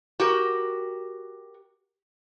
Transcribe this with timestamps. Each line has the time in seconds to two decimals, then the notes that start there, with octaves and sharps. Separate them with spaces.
0.20 F#4 G4 A#4